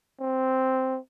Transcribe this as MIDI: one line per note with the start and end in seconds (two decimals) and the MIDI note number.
0.21 0.99 60